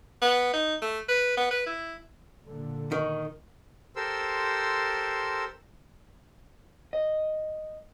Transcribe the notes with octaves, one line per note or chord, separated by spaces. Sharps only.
B3
D#4
A3
B4
B3
B4
E4
A#2 D3
D#3 A#4 D#5 C#6
G4 A4 A#4 C5 C6 E6
D#5